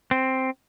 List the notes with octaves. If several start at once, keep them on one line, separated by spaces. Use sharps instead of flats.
C4